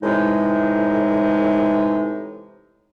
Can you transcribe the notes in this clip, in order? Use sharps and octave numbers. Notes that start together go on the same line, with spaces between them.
A2 C3 E3 G#3 D#4